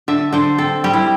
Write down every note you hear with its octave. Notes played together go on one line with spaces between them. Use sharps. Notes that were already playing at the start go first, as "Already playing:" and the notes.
D3 E5
D3 C5
C4 A4
G3 G4
E4